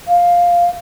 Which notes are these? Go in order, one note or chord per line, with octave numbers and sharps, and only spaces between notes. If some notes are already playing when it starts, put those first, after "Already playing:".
F5